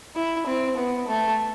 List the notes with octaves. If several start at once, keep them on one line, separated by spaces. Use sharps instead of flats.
E4
C4
B3
A3